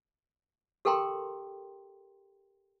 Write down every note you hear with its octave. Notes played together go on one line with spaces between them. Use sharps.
G4 A4 A#4 G5 A#5 C6